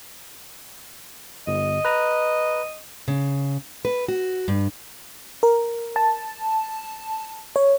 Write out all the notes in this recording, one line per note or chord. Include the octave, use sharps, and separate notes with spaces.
G1 D#5
B4 A#5
C#3
B4
F#4
G2
A#4
A5
C#5